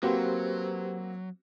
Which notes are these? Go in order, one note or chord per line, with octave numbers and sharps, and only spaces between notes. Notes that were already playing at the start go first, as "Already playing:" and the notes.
F#3 A#3 C4 F#4 G4 B4 C5